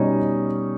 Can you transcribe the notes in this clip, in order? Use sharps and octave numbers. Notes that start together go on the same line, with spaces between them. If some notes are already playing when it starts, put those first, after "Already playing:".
Already playing: B2 G3 C#4 D#4